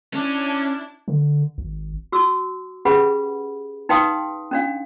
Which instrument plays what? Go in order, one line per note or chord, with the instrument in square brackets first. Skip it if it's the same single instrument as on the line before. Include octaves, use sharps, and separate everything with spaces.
[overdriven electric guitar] C#4 [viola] D4 E4
[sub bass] D3
G#1
[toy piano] F#4 C#6 E6
C#4 G4 G#4 B4 F#5 B5
D#4 B4 F5 G5 C6 D#6
C#4 D4 F5